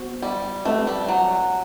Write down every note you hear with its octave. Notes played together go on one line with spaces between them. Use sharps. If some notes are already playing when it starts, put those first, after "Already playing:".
Already playing: B3 F#4 C5
G3
A3 C4 G4 B4
G3
F#3